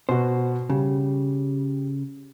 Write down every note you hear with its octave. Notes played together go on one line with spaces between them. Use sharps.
B2 F#4 C5
C#3 G3